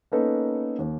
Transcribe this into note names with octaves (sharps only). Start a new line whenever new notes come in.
A#3 B3 C#4 D#4 A4 B4
D#2